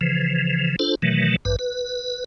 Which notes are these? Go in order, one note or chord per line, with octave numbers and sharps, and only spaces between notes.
C#3 E3 F3
D4 F4 A4 C5
B2 D#3 E3 F#3 A3
A1 G2 B4
B4